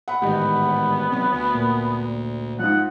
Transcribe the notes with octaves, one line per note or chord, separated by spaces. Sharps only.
F#5 B5
A1 G#2 D#3 B3 G4 D#5
C3 F#3 C4
D2
A#2 A#3
G#2 F3 F#5